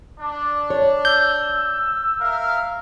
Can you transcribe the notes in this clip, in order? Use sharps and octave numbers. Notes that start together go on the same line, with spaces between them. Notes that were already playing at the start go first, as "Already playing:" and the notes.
D4
C#5
E6 G6
A#4 E5 F5